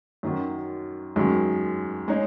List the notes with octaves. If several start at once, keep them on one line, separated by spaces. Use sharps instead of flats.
F#2 D#3 F#3
F#2 D#3 G#3
G#3 D#4 G#4 C#5